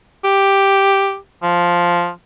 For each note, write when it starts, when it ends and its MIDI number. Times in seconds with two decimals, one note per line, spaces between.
0.24 1.17 67
1.43 2.10 53